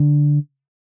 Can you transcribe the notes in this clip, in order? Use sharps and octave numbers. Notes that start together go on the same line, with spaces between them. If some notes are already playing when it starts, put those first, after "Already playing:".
Already playing: D3